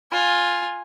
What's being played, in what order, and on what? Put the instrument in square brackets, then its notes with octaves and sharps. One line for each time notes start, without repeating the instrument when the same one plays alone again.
[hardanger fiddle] F4 G#5